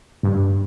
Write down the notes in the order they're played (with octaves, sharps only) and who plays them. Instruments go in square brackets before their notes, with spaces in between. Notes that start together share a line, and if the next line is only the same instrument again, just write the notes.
[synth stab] G2